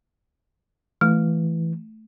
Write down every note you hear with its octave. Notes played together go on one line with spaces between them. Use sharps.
E3 A3